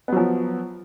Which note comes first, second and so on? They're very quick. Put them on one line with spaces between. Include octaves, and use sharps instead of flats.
B3 F#3 F3